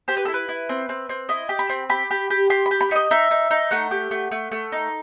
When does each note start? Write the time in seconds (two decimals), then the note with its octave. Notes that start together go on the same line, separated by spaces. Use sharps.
0.08 G4 C5
0.17 B4
0.25 E4 A4
0.34 B4
0.49 E4
0.69 C4
0.89 C4
1.09 C4
1.29 E4 D#5
1.49 G4
1.59 B5
1.69 C4
1.90 G4 B5
2.11 G4
2.30 G4
2.50 G4 C6
2.66 B5
2.71 G4
2.81 B5
2.91 D#4 D#5
3.11 D#4 E5
3.31 D#4
3.51 D#4
3.71 A3 F#5
3.91 G4
4.11 A3
4.31 A3
4.52 A3
4.72 D#4